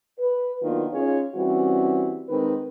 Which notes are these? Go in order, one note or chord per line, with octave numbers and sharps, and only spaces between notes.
B4
D#3 F#3 A#3 B3 D4 F4
C#4 D#4 F4 G#4 C#5
E3 G3 C4 C#4 E4 F#4
D#3 G#3 C4 D#4 A#4 B4